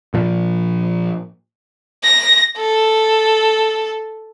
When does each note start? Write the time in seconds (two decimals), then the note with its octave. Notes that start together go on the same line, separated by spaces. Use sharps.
0.14 A#2 F3
2.03 A#6
2.58 A4